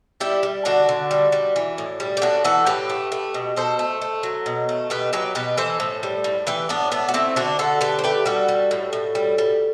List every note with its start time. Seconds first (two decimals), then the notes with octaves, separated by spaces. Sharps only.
0.20 G3 E4 G4
0.43 G3
0.65 D3 D4 F#4
0.89 D3
1.11 G3
1.32 G3
1.56 E3
1.78 A2
2.00 G3
2.17 G4
2.22 A2 D4 F#4
2.44 E3 F#4 A4
2.66 A2 G4 B4
2.89 A3
3.12 A3
3.34 B2
3.56 B2 A4 C5
3.79 A3
4.02 A3
4.23 F#3
4.46 B2
4.69 A3
4.90 B2 G4 B4
5.13 F#3 G4 B4
5.35 B2 G4 B4
5.57 E3 A4 C5
5.80 A2
6.03 G3
6.24 A2
6.47 E3 G4 B4
6.69 A2 B3 D4
6.92 A3 B3 D4
7.08 F#4
7.14 A3 C4 E4
7.36 D3 D4 F#4
7.59 D3 F#4 A4
7.81 A3 G4 B4
7.99 C5
8.04 A3 G4 B4
8.26 G3 F#4 A4
8.48 G3
8.71 A2
8.93 A2
9.15 G3
9.38 G3